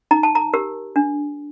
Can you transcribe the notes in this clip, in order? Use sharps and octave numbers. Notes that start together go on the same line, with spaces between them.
D#4 A#5
A5
A#5
G4 A#4
D4